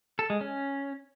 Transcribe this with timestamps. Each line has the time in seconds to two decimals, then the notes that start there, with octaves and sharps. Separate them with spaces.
0.19 A4
0.30 G#3
0.41 C#4